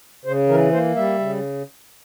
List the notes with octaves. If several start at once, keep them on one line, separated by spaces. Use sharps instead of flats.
C#3 C5
E3 A#4
A#3 C5
G3 E5
C#3